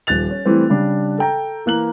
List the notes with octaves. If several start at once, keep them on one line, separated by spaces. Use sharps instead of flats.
D#1 F3 F#6 A6 F7
C#4
E3 G3 A3 C4
C#3 G3 D4
A4 G5 A#5
E3 A#3 F#6 F#7